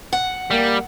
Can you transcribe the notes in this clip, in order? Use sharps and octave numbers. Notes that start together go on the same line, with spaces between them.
F#5
G3 A#3